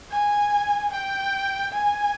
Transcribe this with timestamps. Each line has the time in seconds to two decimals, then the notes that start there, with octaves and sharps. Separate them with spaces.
0.11 G#5
0.91 G5
1.72 G#5